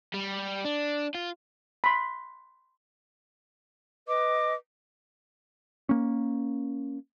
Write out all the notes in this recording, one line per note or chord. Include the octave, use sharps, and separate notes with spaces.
G3
D4
F4
B5 C6
B4 D#5 D6
A#3 C#4